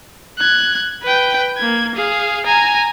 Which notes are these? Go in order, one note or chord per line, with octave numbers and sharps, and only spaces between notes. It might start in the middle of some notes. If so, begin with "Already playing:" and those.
F#6 G#6
B4 G5
A#3 G#6
G#4 F5
G#5 A#5